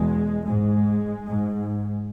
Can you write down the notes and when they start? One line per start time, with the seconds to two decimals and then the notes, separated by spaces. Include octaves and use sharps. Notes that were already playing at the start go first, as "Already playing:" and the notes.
Already playing: E2 B2 G#3
0.46 G#2 G#3
1.26 G#2